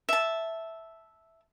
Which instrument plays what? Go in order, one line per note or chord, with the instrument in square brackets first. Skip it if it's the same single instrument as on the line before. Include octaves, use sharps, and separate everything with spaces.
[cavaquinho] E5 A5